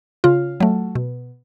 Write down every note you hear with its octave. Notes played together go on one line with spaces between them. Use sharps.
C#3 F4
F#3 A3
B2